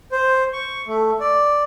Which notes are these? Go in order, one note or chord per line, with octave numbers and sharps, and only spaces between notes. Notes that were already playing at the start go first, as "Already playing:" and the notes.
C5
C#6
A3
D5